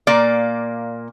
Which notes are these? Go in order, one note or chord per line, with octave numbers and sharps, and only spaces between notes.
A#2 A#3 D5